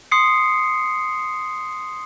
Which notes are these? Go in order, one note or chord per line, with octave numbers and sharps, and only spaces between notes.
C6 D#6 C7 C#7